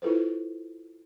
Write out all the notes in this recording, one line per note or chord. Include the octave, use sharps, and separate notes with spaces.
E4 F4 A4 B4 C5